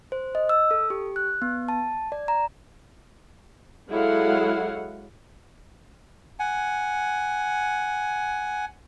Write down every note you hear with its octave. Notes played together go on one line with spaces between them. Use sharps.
C5
D#5
E6
A4
G4
F#6
B3
A5
D5
A#5
F#3 G#3 E4 A4 F5 F#5
F#5 G#5